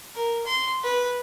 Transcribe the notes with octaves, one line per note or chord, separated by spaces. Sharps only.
A#4
C6
B4